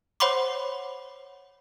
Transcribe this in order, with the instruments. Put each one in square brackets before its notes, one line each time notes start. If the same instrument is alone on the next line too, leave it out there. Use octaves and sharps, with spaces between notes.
[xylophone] C5 C#5 F#5 B5 C6 D6